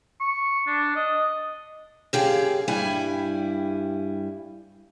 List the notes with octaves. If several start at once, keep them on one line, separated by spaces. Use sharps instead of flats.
C#6
D4
D#5
F#2 G4 G#4 F5
G2 G3 E4 G#5